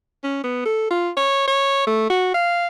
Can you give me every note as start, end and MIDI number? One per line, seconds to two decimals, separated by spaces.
0.24 0.40 61
0.44 0.65 59
0.66 0.90 69
0.91 1.10 65
1.17 1.47 73
1.48 1.83 73
1.87 2.08 57
2.10 2.31 66
2.34 2.67 77